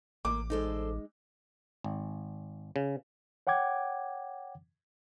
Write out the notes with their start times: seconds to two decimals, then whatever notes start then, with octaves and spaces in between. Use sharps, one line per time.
0.25 A1 A#3 D6
0.50 D2 G#3 D#4 A4 C5
1.84 G#1
2.76 C#3
3.47 C#5 F#5 G5 D6 G#6